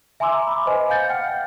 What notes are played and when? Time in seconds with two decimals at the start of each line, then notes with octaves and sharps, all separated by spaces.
0.20 E5 G#5 A#5 C6 D6 E6
0.47 B5 D6
0.66 B4 C5 D#5 G#5
0.89 F5 G#5 G6 A6 C#7
1.09 F#5 G5 F6 C#7
1.29 F5